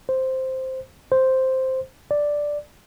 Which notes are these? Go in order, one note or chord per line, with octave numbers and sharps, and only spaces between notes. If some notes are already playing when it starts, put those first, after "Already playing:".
C5
C5
D5